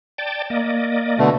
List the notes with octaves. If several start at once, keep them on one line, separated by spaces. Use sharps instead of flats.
D5 G5 A5
A#3 D5 D#5
B2 D3 A3